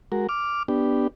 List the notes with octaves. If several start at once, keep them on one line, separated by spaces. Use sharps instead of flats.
G#3 F#4 A#4
D6 F6
B3 D4 G4